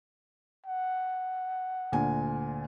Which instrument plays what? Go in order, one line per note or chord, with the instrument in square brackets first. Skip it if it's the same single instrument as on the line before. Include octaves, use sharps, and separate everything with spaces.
[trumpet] F#5
[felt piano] D2 A#2 G#5